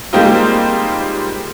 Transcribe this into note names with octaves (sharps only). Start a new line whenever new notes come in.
G3 G#3 A#3 C4 D#4 F4